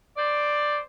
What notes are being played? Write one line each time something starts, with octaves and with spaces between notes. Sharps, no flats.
C5 D5